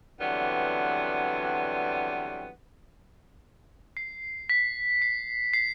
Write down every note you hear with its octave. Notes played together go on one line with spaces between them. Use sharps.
D3 E3 F#3 G3 B3 C4
C7
B6
C7
C7